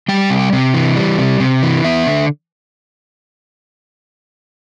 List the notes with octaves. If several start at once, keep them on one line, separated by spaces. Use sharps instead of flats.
G3 G5
C3
C3
E3
G3
C3
C3
E3
B3 E5
D3